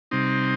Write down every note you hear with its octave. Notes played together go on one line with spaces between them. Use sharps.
C3 G3 C4 D#4